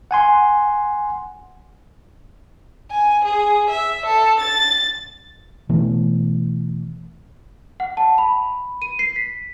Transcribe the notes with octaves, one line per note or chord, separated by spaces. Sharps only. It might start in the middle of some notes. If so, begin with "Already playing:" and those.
F#5 G#5 C6
G#5
G#4
E5
A4
A6
B2 E3 A3
F#5
A5
B5
D#7
C7
B6